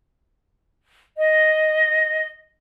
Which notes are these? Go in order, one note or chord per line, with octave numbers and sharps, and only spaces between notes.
D#5